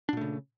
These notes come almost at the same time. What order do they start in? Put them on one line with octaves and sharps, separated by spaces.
D4 A#2 A3 C#3